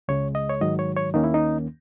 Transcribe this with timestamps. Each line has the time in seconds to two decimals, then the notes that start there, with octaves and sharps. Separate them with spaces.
0.08 C#2 C#3 G#3 C#5
0.35 D#5
0.50 C#5
0.61 G#2 D#3 F#3 D#5
0.79 C#5
0.97 C#5
1.14 D#2 D#3 A#3 C#4 D#4
1.24 E4
1.34 D#4